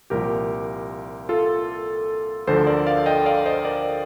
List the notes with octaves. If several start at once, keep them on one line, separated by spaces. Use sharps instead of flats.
C2 A#2 F3 G4 A#4
F4 A4
D2 D3 F3 A4 C5
A#4 D5
D5 F5
D#5 G5
D5 F5
C5 D#5
A#4 D5